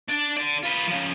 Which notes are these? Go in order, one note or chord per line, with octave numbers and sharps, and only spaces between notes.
D4 D5
D3 D5
F4 B4
C#3 F3